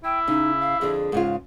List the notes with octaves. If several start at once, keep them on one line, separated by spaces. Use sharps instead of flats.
E4 G5
C#3 D#4
F5
F2 D3 G#4
G#2 C#3 F4